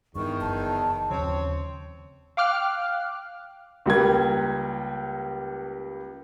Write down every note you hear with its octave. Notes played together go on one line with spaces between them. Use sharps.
E2 G2 D#3 C#6
F#1 A5
D#2 C#3 F3 C4 C#5
F5 G5 D6 F6 F#6
C#2 G3 A#3 G#6